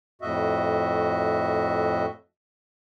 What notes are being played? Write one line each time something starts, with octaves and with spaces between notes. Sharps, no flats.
F2 A2 F#4 D#5 E5